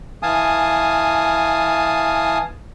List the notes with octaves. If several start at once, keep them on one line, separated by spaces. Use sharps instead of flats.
E3 F5 G#5 A5 D#6